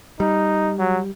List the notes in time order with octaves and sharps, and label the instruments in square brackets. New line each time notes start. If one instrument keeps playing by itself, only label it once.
[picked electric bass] G3 [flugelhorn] D#4
[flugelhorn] F#3